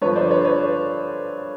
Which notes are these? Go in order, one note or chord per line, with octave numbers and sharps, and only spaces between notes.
G2 D3 F3 B4 C#5
C5 D5
B4 C#5
B4 C#5